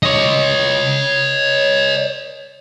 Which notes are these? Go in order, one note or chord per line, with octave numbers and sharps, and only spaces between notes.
C#5 D#5